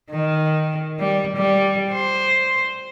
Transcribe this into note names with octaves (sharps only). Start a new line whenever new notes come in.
D#3
G3
G3
C5